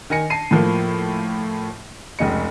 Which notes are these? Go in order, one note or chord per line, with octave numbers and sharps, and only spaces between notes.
D#3 G#5 A#6 C#7
A5 C7 D#7
A2 F3 A#3
F1 C#2 D#5 C#7